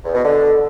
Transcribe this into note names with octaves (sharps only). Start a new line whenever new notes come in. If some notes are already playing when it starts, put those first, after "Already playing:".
E2
B2
D3